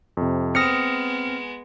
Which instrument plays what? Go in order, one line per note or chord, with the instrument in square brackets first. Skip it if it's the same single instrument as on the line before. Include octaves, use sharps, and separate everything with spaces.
[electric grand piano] F2 C3
[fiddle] G#3 B3 [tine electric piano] C4 F6 A#6 [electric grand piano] D#6 C#7